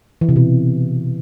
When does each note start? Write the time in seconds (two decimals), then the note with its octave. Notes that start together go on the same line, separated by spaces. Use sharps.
0.21 E3
0.29 C3
0.36 B2